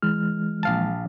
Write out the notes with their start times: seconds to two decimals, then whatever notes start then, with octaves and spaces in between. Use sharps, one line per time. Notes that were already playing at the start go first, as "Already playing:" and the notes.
0.02 E3 G#3 F6
0.63 A#1 F5 A5